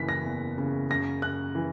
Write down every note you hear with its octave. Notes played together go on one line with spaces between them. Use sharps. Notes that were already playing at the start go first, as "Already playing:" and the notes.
Already playing: F#1 E3 B6
A#6
E2
C#3
F#2 A#6
F#2 F#6
E3